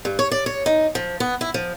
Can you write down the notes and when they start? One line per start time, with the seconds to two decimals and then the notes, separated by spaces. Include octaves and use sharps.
0.05 G2
0.19 C#5
0.32 D5
0.46 C#5
0.66 D#4
0.95 F3
1.20 B3
1.41 E4
1.54 F3